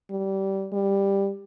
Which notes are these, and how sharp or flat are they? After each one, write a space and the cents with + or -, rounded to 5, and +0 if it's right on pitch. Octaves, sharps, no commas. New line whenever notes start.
G3 -20
G3 +10